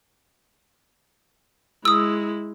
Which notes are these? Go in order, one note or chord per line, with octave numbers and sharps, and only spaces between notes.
G#3 E4 D#6 E6